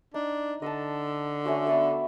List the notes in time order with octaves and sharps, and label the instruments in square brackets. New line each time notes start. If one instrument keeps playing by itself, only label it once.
[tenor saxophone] D4 [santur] D#4
[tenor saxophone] D3 [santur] D#5 F#5 A5
[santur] A3 C#4 F#4
B3 D5 E5